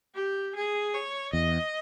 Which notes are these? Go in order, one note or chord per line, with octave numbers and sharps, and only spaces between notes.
G4
G#4
C#5
E2 D#5